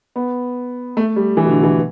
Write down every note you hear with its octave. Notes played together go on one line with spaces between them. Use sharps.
B3
A3
G3
E3
B2
D3
E3